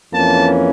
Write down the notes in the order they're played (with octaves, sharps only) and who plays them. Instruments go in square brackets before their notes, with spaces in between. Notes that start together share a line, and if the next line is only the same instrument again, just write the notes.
[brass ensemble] F2 E3 A#3 C#4 A5